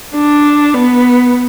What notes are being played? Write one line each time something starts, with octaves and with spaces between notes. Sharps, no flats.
D4
B3